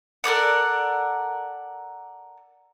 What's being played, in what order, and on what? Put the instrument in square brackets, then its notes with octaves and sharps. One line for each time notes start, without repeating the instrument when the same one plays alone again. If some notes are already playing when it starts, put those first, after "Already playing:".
[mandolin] A4 A#4 D5 F#5